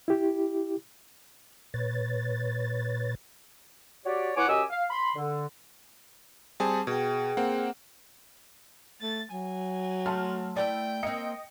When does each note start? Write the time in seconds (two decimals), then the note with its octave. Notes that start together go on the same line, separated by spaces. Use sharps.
0.08 E4 G4
1.74 A#2 B4 C#5 A6
4.05 F#4 G4 C#5 D5
4.36 B3 E4 C#5 F#5 G#5 D6
4.49 F#2 G4 D#5 G#5 D6 E6
4.70 F5
4.90 B5 C6
5.16 D3
6.60 G3 C4 G#4 A5
6.87 B2 G#4 G5
7.37 A#3 C4 F#5
9.02 A3 A6
9.32 F#3 G#5
10.06 A3 A5 C6 F6
10.56 A3 E4 D5 G5
11.03 A#3 C4 D#5 C#7